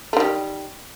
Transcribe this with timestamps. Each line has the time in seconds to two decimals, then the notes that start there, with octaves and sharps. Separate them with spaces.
0.13 A3
0.17 D#3
0.20 G3